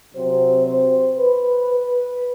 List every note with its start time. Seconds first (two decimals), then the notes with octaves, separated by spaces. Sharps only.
0.14 C3 F#3 C4 C5
0.65 C5
1.17 B4
1.68 B4